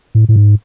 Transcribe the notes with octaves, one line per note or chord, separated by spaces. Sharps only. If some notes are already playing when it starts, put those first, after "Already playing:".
A2
A2
G#2